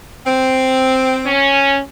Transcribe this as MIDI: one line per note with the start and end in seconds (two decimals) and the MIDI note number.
0.25 1.30 60
1.26 1.79 61